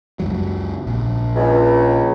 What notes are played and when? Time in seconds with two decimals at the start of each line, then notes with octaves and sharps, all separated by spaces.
0.20 C#2 F#2 F#3
0.87 A#1
1.36 C#2